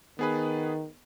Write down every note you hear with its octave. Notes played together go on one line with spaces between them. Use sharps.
D#3 B3 G#4 B4